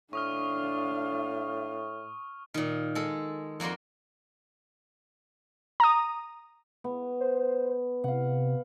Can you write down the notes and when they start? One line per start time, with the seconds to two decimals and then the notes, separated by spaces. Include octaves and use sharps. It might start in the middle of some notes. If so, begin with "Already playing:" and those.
0.13 A2 D4 F5 C#6 D#6 F6
2.54 A#2 D#3
2.95 G#3 A4
3.60 F2 A#3 F#4 D5 C6
5.80 A#5 D#6
6.84 B3
7.20 C5
8.04 C3 F5 F#5